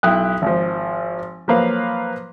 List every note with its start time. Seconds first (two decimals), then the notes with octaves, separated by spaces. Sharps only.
0.03 B1 E4 G5 D#6 F#6
0.42 G#1 F3
1.48 F3 F#3 A#3 B4 F5